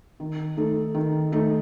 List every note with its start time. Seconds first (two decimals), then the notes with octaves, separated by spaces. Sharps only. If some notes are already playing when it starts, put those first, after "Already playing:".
0.20 D#3
0.57 A3 D#4 A4
0.95 D#3
1.32 A3 D#4 A4